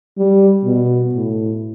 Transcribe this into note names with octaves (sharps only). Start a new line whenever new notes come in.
G3
B2
A2